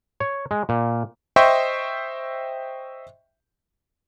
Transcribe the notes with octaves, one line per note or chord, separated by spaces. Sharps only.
C#5
G#3
A#2
C5 D#5 E5 G5 C6 C#6